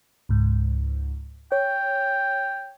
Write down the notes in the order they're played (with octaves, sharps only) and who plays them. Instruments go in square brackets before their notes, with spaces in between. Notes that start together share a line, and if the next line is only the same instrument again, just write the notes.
[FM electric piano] C#2 G#2
[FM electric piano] C#5 [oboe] G5